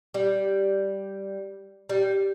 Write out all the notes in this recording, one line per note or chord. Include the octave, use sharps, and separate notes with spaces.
G3
G3